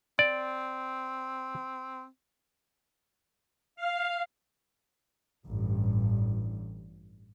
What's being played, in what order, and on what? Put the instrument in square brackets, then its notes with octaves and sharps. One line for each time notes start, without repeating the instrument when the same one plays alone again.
[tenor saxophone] C4 [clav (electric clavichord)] D5
[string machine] F5
[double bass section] A1 G2